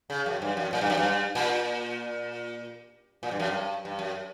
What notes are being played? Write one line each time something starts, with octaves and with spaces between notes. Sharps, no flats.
C#3
F#2
G2
F#2
A#2
G2
F#2
G2
A#2
A#2
G2
F#2
G2
G2
F#2